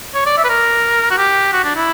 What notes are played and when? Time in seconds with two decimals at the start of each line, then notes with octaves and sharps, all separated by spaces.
0.14 C#5
0.26 D5
0.38 E5
0.44 B4
0.49 A#4
1.10 F#4
1.18 G4
1.53 F#4
1.64 D4
1.76 E4